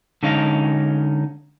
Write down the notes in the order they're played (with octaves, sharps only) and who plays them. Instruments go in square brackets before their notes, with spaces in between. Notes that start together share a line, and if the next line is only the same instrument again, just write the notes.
[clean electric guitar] D3 G#3 C#4 D#4 F5